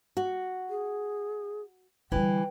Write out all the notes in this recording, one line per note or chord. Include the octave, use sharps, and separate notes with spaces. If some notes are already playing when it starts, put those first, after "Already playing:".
F#4
G#4
D3 E3 G3 G5